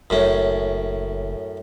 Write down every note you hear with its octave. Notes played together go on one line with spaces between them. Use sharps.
F#1 F#2 A2 C#4